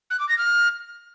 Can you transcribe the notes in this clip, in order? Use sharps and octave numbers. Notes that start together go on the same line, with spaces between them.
F#6
D6
A#6
F6